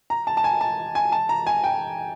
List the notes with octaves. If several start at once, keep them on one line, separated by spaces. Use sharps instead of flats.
A#5
A5
A5
G#5
A5
G#5
A5
A#5
G#5
G5